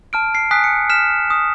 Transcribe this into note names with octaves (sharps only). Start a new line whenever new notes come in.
A5 F6 D7
C7
G#5 D#6 F#6 B6
C#7
F6 B6 E7
D#6